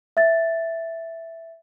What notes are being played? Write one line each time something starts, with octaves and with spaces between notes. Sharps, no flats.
E5 A6